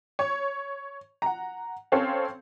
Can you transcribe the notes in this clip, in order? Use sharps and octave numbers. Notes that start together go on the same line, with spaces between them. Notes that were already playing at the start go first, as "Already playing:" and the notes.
C#5
F#5 A#5
C4 C#4 A4 C#5 F5